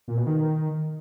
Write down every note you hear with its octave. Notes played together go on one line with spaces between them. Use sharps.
A#2
B2
D#3